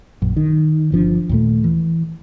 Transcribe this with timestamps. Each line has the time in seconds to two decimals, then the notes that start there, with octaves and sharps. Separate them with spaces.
0.22 A#1 F#2
0.37 D#3
0.92 G1 F3 D4
1.29 D#2 A#2 A3
1.64 E3